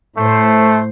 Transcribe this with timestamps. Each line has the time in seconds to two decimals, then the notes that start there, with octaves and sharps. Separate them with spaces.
0.17 A2 A3 C5